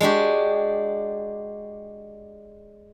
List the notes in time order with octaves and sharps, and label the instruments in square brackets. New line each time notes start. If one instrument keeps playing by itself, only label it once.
[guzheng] G#3 D4 F#4 G4